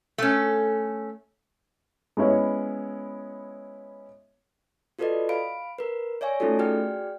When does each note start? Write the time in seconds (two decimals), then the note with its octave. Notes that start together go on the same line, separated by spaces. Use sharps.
0.18 A3 C#4
2.17 G#3 B3 C#4 E4 C#5
4.99 F4 F#4 A4 B4 D5 D#5
5.29 F5 B5 D7
5.78 A#4 B4
6.21 C#5 D5 E5 G#5 C#6
6.40 A3 C#4 D#4 F4 F#4 A4
6.59 F#4 G#4 D5 G5 F6